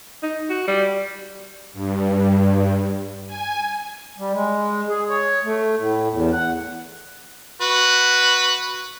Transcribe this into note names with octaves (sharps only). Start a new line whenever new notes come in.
D#4
F#4
G3
G2
G#5
G3
G#3
G#4
C#5
A3
A2
E2
F#5
F#4 B4